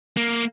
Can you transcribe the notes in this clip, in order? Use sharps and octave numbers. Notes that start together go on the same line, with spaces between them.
A#3